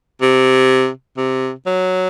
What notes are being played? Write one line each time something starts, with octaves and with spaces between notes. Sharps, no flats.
C3
C3
F#3